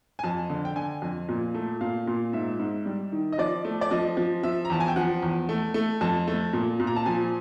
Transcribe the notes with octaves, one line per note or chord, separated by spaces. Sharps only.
G#5
F2 A5
D3
G5
D3 G#5
F2
A#2
A3
A#2 F5
A#2
G#2 E5
G#2
G3
D#3
D#5
F3 D5
A3
D5
F3 D#5
F3
F3 E5
A#5
E2 A5
G#5
G5
F3 F#5
E2
A3
A3
F2 A5
A3
A#2
A#2
A#5
A5
F3 G#5